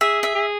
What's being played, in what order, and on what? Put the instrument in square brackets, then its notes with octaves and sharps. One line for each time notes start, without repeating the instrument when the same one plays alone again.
[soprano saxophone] G#4 [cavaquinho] E5
[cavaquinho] E5
[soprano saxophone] G#4